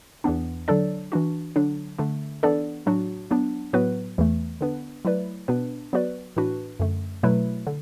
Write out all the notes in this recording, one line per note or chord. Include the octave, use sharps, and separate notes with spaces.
E2 E3 B3 D4
D3 F#3 D4 A4 D5
E3 D4 F#4
D3 F#3 D4
D3 A3 D4
E3 B3 D4 A4 D5
A2 F#3 D4 F#4
F#3 B3 D4
A2 F#3 B3 F#4 B4
E2 E3 A3
D3 B3 D4 B4
F#3 A3 E4 B4 D5
B2 B3 D4 B4
F#3 B3 F#4 B4 D5
A2 E3 D4 F#4 B4
F#2 D3 A3
B2 F#3 A3 E4 B4
D3